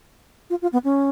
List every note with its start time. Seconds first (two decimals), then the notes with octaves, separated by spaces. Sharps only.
0.50 F4
0.62 F4
0.73 B3
0.84 C#4